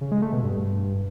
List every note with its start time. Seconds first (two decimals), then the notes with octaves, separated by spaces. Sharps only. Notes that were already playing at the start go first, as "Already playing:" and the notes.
0.01 C#3
0.12 G#3
0.22 A3
0.33 B2
0.43 G2